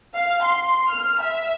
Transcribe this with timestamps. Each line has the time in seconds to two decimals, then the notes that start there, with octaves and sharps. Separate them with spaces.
0.14 F5
0.44 C6
0.90 F6
1.22 E5